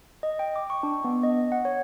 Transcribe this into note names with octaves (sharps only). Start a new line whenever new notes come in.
D#5
G5
D6
C#6
D4
B3
D#5
F#5
C#5